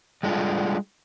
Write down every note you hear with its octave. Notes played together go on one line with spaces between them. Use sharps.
G3 G#3 D4 F4 A4